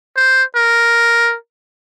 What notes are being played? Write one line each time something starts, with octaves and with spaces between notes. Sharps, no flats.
C5
A#4